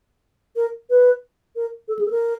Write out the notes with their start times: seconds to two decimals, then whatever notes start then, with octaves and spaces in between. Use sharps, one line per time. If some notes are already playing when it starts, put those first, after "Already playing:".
0.56 A#4
0.90 B4
1.56 A#4
1.88 A4
1.99 G#4
2.06 A4
2.11 A#4